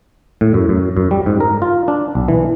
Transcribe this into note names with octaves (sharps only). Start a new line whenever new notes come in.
A2
F#2
F#2
F#2
G3
G#2
A#4
F4
D4
B1
E3